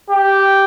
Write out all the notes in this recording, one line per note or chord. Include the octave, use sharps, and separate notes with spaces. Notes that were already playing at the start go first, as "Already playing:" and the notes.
G4